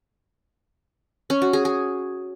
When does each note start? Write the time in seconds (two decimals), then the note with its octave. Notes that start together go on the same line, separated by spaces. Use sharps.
1.30 C#4
1.42 F#4
1.53 G#4
1.65 G#4